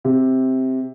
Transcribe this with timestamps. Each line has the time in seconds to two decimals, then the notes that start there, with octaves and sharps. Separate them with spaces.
0.04 C3